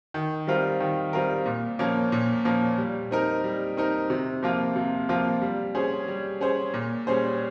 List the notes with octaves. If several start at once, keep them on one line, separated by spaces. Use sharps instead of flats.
D#3
G3 C4 F4 A#4
D#3
G3 C4 F4 A#4
A#2
F3 A#3 C#4
A#2
F3 A#3 C#4
G3
C4 D#4 A#4
G3
C4 D#4 A#4
C3
F3 A#3 F4
C3
F3 A#3 F4
G3
C#4 G#4 C5
G3
C#4 G#4 C5
A#2
G3 C#4 G#4 C5